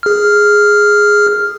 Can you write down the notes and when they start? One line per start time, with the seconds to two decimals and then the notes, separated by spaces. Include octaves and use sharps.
0.03 G#4 F6